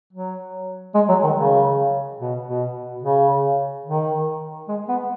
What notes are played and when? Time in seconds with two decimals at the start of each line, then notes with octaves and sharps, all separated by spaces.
0.13 F#3
0.94 G#3
1.09 F#3
1.23 D#3
1.36 C#3
2.20 B2
2.47 B2
3.03 C#3
3.86 D#3
4.68 G#3
4.88 B3